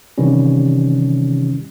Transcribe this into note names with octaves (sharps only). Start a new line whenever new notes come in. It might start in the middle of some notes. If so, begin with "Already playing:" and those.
C3 D#3 E3 G3 C#4